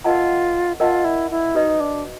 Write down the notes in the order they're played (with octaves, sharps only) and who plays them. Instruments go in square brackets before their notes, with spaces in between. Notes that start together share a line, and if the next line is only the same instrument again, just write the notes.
[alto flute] F4 [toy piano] A#4 D#5 F#5 A5
[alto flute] F4 [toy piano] A#4 D#5 F#5 A5
[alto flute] E4
E4
[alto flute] D#4 [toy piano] F#4 B4 D#5
[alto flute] D4